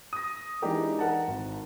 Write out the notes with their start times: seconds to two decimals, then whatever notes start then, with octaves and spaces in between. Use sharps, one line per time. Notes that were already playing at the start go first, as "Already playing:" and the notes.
0.13 D#6 A#6
0.62 E3 G#3 D4 D#4 G4 A#4
0.99 A#4 F#5 A5
1.28 G#1